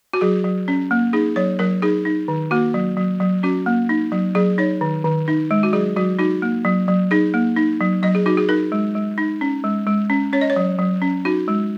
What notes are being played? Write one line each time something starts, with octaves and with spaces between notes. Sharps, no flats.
F#4
F#3 G#4
F#3
C#4
A#3
D#4 G#4
F#3 C#5
F#3 A#4
D#4 G#4
D#4
D#3
A#3 F#4
F#3
F#3
F#3
C#4 F#4
A#3
D#4
F#3
F#3 G#4
D#4 C#5
D#3
D#3
D#4
G#3
F#4
F#3 G#4
F#3 F#4
D#4 F#4
A#3
F#3
F#3
D#4 G#4
A#3
D#4
F#3
F#3 D#5
G#4
D#4 F#4
G#4
D#4 A#4
G#3
G#3
D#4
C#4
G#3
G#3
C#4
C#4 C#5
D#5
C#5
F#3
F#3
C#4
D#4 F#4
G#3